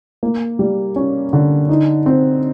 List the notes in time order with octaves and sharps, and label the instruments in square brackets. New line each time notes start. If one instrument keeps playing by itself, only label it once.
[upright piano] A#3
G3
C#4
D3
D#4
C4